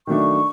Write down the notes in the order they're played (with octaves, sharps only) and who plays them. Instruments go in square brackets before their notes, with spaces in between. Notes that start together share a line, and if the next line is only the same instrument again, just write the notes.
[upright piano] D#3 F#3 A3 D4 [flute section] C#6